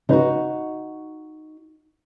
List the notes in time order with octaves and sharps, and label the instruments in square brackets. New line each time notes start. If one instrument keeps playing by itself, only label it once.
[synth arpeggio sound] C#3 C#4 B4 [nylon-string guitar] D#4 F#4